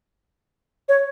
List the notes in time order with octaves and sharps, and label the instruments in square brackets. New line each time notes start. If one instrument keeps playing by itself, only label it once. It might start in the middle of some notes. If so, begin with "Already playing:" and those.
[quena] C#5